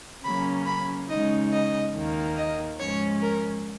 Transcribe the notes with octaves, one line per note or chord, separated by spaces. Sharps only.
C#3 F#3 A#3 C#4 B5
B5
C#3 G#3 D#4 D#5
D#5
D#2 D#3 A#3
D#5
G#2 F3 G#3 C#4 C#5
A#4